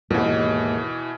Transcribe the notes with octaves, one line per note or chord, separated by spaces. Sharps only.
D#2 G#2 B2 E3